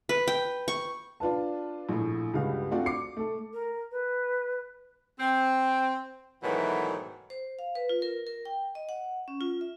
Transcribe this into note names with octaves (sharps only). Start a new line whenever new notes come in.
B4
G5
C#6
D4 F4 B4 A5
A#1 A2
C#2 G2 G3 F#4 F5
A3 C4 D4 F4 F#4 D5
D6 C7 C#7
A3 A4
A#4
B4
C4
G#2 B2 D#3 E3 F#3 A3
C5
F5
B4
F4
A#4
A#4
G5
D#5
F#5
C#4
F4
E5